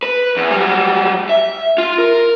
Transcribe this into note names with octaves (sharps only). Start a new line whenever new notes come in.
B4
E2
F#3 G3
E5
F4
A#4